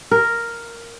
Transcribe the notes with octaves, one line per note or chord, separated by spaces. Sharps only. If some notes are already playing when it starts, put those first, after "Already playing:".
A#4